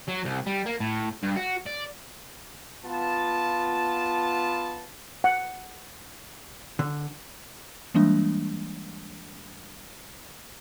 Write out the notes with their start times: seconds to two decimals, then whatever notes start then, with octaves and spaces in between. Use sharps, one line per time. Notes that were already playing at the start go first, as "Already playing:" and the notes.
0.08 F#3
0.25 C2
0.47 G3
0.66 A#3
0.80 A2
1.23 G2
1.36 F#4
1.66 D5
2.85 B3 F4 A5
5.24 F#5
6.79 D3
7.94 E3 G3 G#3 A#3 D4